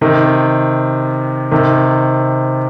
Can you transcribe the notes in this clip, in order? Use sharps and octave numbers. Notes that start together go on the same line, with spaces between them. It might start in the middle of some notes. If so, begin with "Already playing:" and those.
C3 D#3
C3 D#3